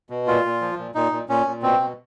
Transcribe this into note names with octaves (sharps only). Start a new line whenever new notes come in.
B2
A#2 F4
A#2
F3
A#2
A#2 D#4
A#2
A#2 C#4
A#2
B2 C4
B2